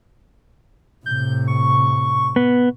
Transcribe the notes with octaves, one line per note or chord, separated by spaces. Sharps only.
A2 C3 G6
C#6
B3